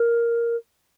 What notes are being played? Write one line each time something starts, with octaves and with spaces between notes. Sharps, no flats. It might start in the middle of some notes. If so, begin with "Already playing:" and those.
Already playing: A#4